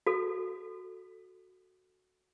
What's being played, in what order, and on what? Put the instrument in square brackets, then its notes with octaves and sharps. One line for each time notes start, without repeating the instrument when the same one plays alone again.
[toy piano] F#4 A4